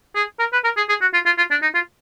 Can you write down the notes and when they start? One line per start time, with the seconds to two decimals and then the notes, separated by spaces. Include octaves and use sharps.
0.15 G#4
0.39 A#4
0.53 B4
0.64 A#4
0.77 G#4
0.89 G#4
1.01 F#4
1.14 F4
1.25 F4
1.38 F4
1.51 D4
1.62 D#4
1.74 F4